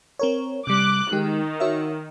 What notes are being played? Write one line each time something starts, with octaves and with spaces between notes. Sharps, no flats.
C4 A#4 C#5
C3 G3 D6 F#6
D#3 G#3 G4
F#4 C#5 E5